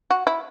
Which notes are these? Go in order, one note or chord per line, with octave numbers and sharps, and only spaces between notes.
F#4
E4